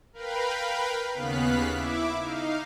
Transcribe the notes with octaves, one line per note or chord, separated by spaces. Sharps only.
A#4 B4 F5 G5 B5
D#2 C#3 B3 F5 F#6 B6
E4 E5 D6
D#4 F5